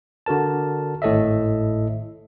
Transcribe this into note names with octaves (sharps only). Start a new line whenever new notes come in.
D3 F#4 A#4 A5
G#1 A2 A4 D#5 E5